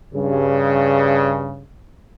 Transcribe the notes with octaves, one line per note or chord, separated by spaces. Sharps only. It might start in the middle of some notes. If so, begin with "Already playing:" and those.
G2 C#3